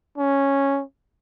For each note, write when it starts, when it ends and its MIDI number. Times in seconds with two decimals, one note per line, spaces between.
0.18 0.83 61